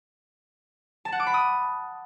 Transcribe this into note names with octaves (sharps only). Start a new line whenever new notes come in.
A5
F#5
D6
B5
D#6